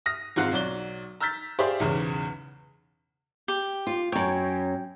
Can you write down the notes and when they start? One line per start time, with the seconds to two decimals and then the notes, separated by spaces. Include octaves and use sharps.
0.06 D#6 F6 A#6
0.36 G#1 G#2 C4 F4 F#5 F#6
0.51 B1 F#3 D5 G7
1.20 A#5 E6 F6 G6 A6 B6
1.59 G4 G#4 C5 D5 E5 F5
1.80 B1 E2 G#2 C#3
3.48 G4
3.87 F4
4.12 F#2 C#5 G5